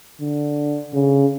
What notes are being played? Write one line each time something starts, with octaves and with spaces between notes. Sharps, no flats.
D3
C#3